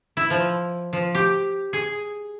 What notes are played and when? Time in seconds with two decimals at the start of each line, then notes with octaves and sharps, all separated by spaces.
0.17 E4
0.30 F3
0.93 F3
1.15 G4
1.73 G#4